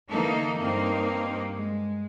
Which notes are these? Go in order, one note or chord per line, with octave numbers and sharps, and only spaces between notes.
D3 E3 A#3 D#4 A4
G2 A#3 C4 D#4
G#3